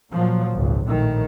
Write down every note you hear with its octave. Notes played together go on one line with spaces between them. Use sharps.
A#2 F3 F#3
G#1 C#2
A#1 A2 D#3